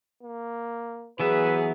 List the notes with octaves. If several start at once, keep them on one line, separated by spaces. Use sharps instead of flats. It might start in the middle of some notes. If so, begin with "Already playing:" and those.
A#3
E3 F#3 B3 G#4 B4 E5